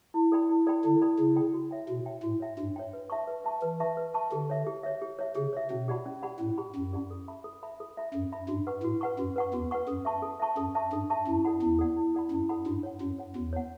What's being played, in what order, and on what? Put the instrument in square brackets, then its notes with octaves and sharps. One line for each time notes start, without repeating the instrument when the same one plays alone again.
[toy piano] E4
A4 D5 G5 B5
E4
A4 D5 G5 B5
[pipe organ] D3 [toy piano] E4
[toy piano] A4 D5 G5 B5
[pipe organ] C#3 [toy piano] E4
[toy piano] A4 D5 G5 B5
F#4
C#5 E5 G5
[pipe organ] B2 [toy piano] F#4
[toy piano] C#5 E5 G5
[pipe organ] A2 [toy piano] F#4
[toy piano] C#5 E5 G5
[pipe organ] G2 [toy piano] F#4
[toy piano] C#5 E5 G5
B4
E5 A5 C#6
B4
E5 A5 C#6
[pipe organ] E3 [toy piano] B4
[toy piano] E5 A5 C#6
B4
E5 A5 C#6
[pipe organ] D3 [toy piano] G4
[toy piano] C#5 E5
G4
C#5 E5
G4
C#5 E5
[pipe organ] C#3 [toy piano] G4
[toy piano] C#5 E5
[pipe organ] B2 [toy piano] C#4
[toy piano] G4 D5 F#5 B5
C#4
G4 D5 F#5 B5
[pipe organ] A2 [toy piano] C#4
[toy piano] G4 D5 F#5 B5
[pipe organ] F#2 [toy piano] C#4
[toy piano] G4 D5 F#5 B5
A4
E5 B5
A4
E5 B5
A4
E5 B5
[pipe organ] F#2 [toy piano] A4
[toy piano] E5 B5
[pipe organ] G2 [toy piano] F#4
[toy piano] B4 F#5 C#6
[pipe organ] A2 [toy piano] F#4
[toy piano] B4 F#5 C#6
[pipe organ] F#2 [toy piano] F#4
[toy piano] B4 F#5 C#6
[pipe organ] E2 [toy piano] F#4
[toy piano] B4 F#5 C#6
[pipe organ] F#2 [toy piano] A4
[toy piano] E5 A5 C#6
A4
E5 A5 C#6
[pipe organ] F#2 [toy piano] A4
[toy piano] E5 A5 C#6
[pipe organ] G2 [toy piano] A4
[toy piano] E5 A5 C#6
[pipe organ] F#2 [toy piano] E4
[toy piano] A4 D5 F#5 B5
[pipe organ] E2 [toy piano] E4
[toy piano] A4 D5 F#5 B5
E4
A4 D5 F#5 B5
[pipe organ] F#2 [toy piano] E4
[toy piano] A4 D5 F#5 B5
[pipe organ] G2 [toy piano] F#4
[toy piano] C#5 F#5
[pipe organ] F#2 [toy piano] F#4
[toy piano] C#5 F#5
[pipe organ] E2 [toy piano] F#4
[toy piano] C#5 F#5